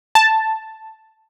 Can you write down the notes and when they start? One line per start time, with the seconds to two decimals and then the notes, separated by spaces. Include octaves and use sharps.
0.15 A5